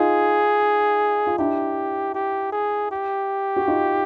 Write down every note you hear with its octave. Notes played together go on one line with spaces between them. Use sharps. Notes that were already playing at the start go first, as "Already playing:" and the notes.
Already playing: D#4 F4 G#4
F4
D4 E4 G4
G4
G#4
G4
F#4
D#4 F4